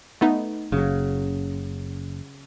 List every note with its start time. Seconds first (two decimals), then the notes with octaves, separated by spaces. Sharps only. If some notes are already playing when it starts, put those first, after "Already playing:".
0.21 A3 B3 D#4
0.72 F#1 C#3 F#3